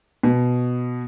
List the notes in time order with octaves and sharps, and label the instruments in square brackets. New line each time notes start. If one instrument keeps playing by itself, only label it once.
[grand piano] B2